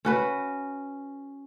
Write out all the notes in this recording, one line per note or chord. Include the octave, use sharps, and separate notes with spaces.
C#4 F#4 B4